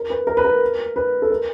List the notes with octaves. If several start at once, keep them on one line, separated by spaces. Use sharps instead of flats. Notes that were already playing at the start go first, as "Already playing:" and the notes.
Already playing: A#4
B4
A#4
B4
A#4
B4
A4
A#4